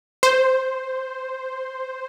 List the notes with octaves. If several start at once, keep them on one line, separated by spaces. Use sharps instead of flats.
C5